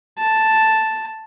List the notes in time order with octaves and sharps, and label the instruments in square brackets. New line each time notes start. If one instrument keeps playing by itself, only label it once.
[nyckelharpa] A5